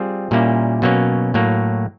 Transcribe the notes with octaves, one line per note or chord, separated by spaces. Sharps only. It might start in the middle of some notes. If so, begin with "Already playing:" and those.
Already playing: G3 C4 F4 G#4
A#2 G3 A#3 C#4 E4
B2 F#3 A#3 C#4
A2 F#3 A#3